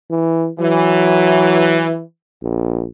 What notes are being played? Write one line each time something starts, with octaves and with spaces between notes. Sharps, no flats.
E3
E3 F#3
A#1